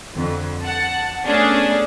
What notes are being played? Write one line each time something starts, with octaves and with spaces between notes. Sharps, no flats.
F2 D3
F#5 A5
A3 B3 C#4 D4 G#4